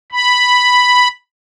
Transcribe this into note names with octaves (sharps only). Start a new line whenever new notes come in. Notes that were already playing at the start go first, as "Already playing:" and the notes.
B5